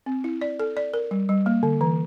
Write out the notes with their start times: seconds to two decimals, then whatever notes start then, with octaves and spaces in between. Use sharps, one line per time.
0.06 C4
0.24 E4
0.41 D5
0.60 A4
0.77 D5
0.94 A#4
1.11 G3
1.29 G3
1.46 A#3
1.63 D3
1.81 E3